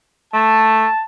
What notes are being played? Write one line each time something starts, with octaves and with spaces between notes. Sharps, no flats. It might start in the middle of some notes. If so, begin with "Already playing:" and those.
A3 A5